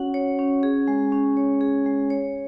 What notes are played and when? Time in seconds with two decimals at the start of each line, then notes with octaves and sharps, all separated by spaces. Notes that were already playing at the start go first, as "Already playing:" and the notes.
Already playing: C#4 F#4 C#5 F#5
0.14 C#5
0.39 C#4
0.63 G#4
0.88 G#3
1.12 C#4
1.37 C#5
1.61 G#4
1.86 G#3
2.10 C#5